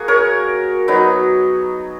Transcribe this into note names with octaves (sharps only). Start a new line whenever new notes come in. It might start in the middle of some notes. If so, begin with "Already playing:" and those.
Already playing: A#3 F#4 G#4
A#4 C#5
F#3 B3 D#4